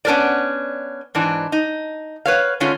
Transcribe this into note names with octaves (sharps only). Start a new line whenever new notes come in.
B3 C#4 D4 A#4 C5 D5
G#2 E3 D4
D#4
B4 C#5 F5
D3 G#3 A3 C#4 F4